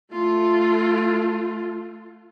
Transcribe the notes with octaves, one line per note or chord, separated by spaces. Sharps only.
A3 F4